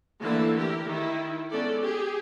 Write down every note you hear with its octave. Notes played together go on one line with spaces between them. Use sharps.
D3 E3 A3 A#3 E4 A5
E4 G4 A#4
D#3 E4
G#3 B3 C#4 A4 D5
G4 G#4